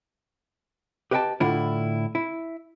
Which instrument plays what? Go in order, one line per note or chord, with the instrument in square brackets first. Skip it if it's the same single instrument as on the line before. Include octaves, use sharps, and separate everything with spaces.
[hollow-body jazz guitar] G4 B4 D#5 F5 G5 A5
A2 D3 D4 E4 F4
E4